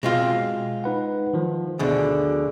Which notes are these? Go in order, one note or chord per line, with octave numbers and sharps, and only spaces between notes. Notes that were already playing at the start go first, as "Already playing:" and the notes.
B2 G#3 C4 F4
D#4 B4 F#5
D#3 F3
D2 B2 D3 G#4